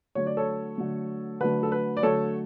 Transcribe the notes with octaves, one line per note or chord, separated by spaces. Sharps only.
D3 F#3 A3 C#5
D5
A4 C#5
D3 F#3 A3
D3 F#3 A3 B4
A4
B4
D5
D3 F#3 A3 A4 C#5